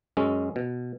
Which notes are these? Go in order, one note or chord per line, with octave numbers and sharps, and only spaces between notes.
F#2 G#3 C#4
B2